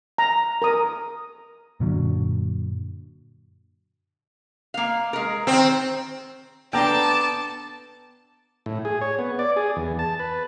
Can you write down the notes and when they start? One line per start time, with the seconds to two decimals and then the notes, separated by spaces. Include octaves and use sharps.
0.18 A#5
0.62 A#4 A#5 D#6
1.80 F#2 A#2 D3 F#3
4.74 A#3 F5
5.13 G#3 A#4
5.47 D#3 C4
6.73 B3 D4 A4 G5 A5 A#5 C6 D6
8.66 A2
8.85 G#4
9.01 C#5
9.19 B3
9.39 D5
9.57 G#4
9.76 E2
9.99 A5
10.19 B4